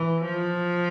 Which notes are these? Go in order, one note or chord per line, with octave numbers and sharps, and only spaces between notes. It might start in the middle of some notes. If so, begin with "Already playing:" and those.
Already playing: E3
F3